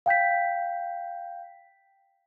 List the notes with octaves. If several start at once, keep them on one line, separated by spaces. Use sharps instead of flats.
F5 G5 G6 B6